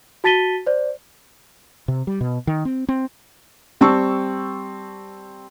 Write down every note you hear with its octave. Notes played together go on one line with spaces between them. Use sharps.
F#4 A5 A6 B6 D#7 G7
C5 D5
C3
G3
B2
D#3
C4
C4
G3 C4 A5 C#6 E6